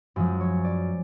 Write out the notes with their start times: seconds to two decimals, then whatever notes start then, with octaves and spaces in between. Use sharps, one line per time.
0.16 F#2 F3 G#3
0.40 C#5
0.64 D5